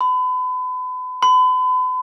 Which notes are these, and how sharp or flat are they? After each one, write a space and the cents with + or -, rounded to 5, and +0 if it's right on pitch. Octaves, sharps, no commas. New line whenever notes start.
B5 +35
B5 +40